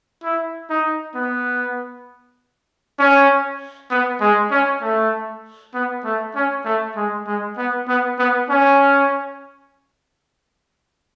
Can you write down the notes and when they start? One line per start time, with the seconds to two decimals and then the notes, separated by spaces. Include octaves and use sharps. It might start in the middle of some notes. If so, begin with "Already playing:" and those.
0.24 E4
0.70 D#4
1.15 B3
2.99 C#4
3.90 B3
4.21 G#3
4.51 C#4
4.82 A3
5.74 B3
6.04 A3
6.35 C#4
6.65 A3
6.96 G#3
7.27 G#3
7.57 B3
7.88 B3
8.18 B3
8.49 C#4